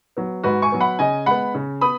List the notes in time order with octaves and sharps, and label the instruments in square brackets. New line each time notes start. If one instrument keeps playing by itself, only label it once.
[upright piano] F#3 B3
G#2 F#4 B4
G#5 C#6
F#3 B3
F#5 B5
C#3 D#5 G#5
G#3 B3 F#5 B5
C#3
B3 B5 D#6